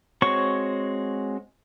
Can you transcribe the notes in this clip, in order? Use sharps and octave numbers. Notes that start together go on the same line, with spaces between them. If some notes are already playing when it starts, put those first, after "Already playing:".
G#3 C4 F#4 C#5 C#6